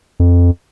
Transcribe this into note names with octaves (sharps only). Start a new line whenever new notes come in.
F2